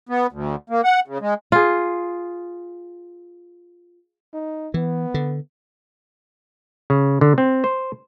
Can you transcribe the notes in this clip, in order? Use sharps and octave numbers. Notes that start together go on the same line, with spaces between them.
B3
D2
A#3
F#5
C#3
G#3
F4 G#4
D#4
E3 B3
D3
C#3
D3
C4
C5